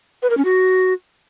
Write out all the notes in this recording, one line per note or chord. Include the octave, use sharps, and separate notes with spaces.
B4
A#4
C#4
F#4